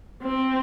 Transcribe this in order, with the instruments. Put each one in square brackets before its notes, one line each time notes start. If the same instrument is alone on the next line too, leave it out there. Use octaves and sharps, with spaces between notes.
[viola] C4